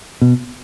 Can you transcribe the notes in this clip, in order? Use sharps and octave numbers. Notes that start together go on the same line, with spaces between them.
B2